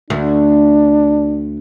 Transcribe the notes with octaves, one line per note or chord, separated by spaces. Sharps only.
D2 D4